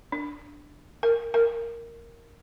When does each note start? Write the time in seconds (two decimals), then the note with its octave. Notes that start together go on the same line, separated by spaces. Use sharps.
0.12 D4
1.03 A#4
1.34 A#4